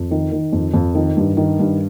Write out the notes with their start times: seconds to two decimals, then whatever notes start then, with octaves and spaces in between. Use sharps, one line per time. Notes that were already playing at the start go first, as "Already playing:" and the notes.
Already playing: F2
0.11 D#3
0.32 D#3
0.52 F2
0.74 F2
0.95 D#3
1.17 G2
1.37 D#3
1.59 G2